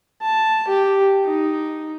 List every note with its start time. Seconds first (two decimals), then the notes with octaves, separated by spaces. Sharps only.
0.22 A5
0.68 G4
1.25 D#4